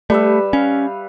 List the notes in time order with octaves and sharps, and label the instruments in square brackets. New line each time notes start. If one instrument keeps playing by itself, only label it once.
[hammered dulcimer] G3 B4 E5 [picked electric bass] A3
[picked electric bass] C#4 [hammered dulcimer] F5